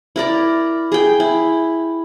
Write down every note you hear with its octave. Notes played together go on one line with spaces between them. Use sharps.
E4 A#4 D5 A#5
G#4 G5
E4